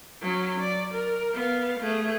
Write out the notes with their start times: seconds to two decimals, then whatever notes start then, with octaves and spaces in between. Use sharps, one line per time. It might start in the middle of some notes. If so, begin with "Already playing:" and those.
0.22 F#3 C#4
0.60 D5
0.94 A#4
1.34 B3 F5
1.80 A3 G#4